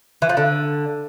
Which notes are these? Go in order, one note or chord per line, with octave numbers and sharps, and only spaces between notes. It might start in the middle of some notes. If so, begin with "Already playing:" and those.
E3
F3
D3